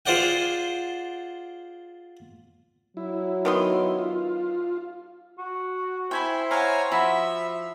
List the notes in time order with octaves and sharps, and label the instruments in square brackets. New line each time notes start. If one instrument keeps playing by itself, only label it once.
[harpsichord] F4 G#4 C5 D5 F#5 G5
[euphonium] F#3 [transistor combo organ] E4
[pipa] D#3 B3 C6
[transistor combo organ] F4
[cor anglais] F#4
[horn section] E4 [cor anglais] C5 [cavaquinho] G5 G#5 B5
[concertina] C#5 G#5 A#5 [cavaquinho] F5 F#5
[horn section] F3 [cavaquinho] E4 F#4 [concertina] E5